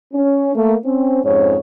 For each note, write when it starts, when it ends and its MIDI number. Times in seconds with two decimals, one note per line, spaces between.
0.13 0.54 61
0.55 0.76 57
0.55 0.76 58
0.55 0.76 70
0.84 1.23 60
0.84 1.23 61
1.24 1.56 41
1.24 1.56 44
1.24 1.56 61
1.24 1.56 73